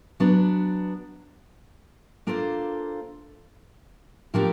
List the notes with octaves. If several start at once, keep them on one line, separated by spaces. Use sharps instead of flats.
F#3 B3 D4
A#3 D4 F4 A4 C5
A2 F3 A#3 D4 G4